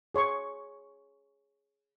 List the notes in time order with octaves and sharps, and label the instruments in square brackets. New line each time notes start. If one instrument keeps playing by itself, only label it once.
[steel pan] G#4 C#5 C6 C#6